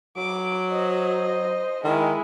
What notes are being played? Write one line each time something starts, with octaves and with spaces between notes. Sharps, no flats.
F#3 D6
C5 D#5
D#3 G#3 E4